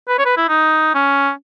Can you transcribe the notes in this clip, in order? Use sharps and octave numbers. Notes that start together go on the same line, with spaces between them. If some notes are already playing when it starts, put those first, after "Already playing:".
B4
C#5
B4
E4
D#4
C#4